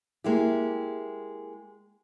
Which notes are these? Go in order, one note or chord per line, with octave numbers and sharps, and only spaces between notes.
G#3 A#3 E4 G4